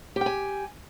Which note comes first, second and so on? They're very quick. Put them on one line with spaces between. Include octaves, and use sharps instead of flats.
G4 G5 G#5